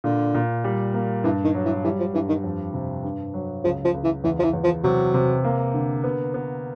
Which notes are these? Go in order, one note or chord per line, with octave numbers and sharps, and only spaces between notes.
A#2 D3
A#2
G3
A#3
G2 E3
D#3
F#3
E3
E3 G3
F3
G2 E3
D#3
F2
C3
G2
F#3
C#2 F3
F3
C#2
E3
E2 E3
F3
E3
E2
F3
C3 F#3
C3
A#3
D3
B3
B3